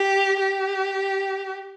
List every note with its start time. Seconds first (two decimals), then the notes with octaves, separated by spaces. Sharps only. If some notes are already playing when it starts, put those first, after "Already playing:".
Already playing: G4
0.40 G4